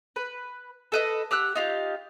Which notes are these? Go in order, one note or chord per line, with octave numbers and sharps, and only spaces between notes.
B4
A4 B4 D#5
G4 F#5 E6 F#6
D#4 F4 G4